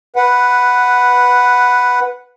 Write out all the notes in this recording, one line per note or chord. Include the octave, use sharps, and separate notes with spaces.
B4 F#5